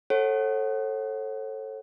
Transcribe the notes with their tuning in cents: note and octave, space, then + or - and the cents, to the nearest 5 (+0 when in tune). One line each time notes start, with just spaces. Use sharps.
A4 +0 C#5 -40 F#5 +10